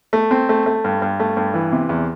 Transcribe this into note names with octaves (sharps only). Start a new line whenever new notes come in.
A3
C4
A3
A3
G2
G2
A3
G2
E3
C3
E2